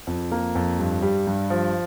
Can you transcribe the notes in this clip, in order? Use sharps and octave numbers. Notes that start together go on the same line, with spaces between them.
F2
A#3
F2
G2
G3
G2
F3